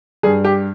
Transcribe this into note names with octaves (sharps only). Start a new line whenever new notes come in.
G2 G#4
G4